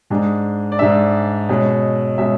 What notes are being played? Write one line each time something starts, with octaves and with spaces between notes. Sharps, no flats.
G#2 G#3 D4
D5
G#2 G#3 D4 E5
B2 G#3 C#4
B2 G#3 C#4 E5